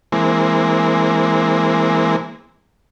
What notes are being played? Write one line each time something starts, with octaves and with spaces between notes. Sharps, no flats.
E3 G#3 A#3 C4